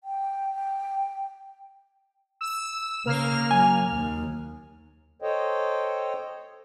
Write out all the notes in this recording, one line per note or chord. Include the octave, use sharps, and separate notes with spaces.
G5
E6
C#3 A#3 F6
F#3 G#5
D#2
A4 C5 C#5 D#5 G5